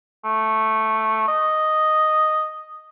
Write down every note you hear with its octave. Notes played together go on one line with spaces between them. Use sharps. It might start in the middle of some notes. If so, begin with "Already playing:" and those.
A3
D#5